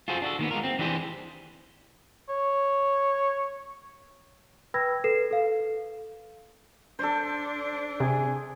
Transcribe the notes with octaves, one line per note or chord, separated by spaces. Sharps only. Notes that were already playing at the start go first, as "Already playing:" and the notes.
F4 F#4 G#4 A4 C5
D4 F#4 A4
D#3 A#3 B3
G#3 F4 A#4
C4
E3 D4 E4 G4 G#4 C5
C#5
B4 G5 B5 E6 G#6 A#6
A4 B4 C7 E7
A4 F5
D4 A4 C5
C3 G#4